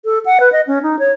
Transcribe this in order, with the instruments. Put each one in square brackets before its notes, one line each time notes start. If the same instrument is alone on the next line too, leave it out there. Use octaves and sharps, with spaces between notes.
[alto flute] A4
F#5
B4
D#5
C#4
D#4
C#5